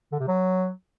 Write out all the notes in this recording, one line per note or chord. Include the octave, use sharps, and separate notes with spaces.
D3
C3
F#3